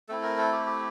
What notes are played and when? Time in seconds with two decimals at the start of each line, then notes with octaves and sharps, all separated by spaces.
0.08 A3 C4 E4 A4
0.23 A#4
0.38 A4
0.52 G4
0.66 G4